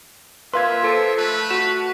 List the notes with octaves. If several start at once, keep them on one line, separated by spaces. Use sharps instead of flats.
A#2 B4 E5 F5 C6 G#6
F3 A4
A3 B4
F#4 C#6 E7